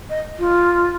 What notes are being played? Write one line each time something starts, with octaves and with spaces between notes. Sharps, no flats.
D#5
F4